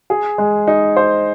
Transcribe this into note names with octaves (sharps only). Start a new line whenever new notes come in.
G#4
G#3
D#4
C5